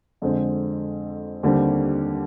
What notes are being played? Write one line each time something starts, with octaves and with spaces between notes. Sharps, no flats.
F2 D3 G#3 C4
D#2 D3 G3 C4